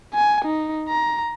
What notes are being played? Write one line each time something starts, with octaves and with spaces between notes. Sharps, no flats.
G#5
D#4
A#5